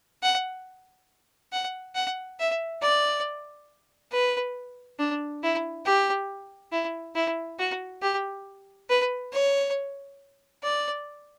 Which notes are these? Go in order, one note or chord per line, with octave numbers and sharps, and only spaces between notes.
F#5
F#5
F#5
E5
D5
B4
D4
E4
G4
E4
E4
F#4
G4
B4
C#5
D5